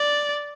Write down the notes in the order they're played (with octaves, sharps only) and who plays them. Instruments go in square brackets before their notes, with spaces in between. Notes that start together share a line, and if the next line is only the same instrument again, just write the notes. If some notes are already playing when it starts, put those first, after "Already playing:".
Already playing: [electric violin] D5